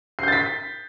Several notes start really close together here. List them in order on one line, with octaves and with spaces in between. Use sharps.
C7 G6 A6 B6